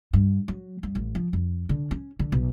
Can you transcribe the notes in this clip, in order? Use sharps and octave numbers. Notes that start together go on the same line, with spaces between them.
G2
F#3
G2
A1
F3
F2
D3
C#4
D3
B1